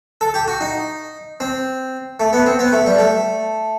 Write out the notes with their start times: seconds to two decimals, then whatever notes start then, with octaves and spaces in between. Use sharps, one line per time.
0.21 A4
0.34 G4
0.48 F#4
0.61 D#4
1.40 C4
2.20 A3
2.33 B3
2.46 C4
2.59 B3
2.72 A3
2.86 G3
2.99 A3